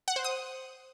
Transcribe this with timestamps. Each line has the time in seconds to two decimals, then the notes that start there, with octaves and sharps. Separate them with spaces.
0.08 F#5
0.16 C5
0.24 D#6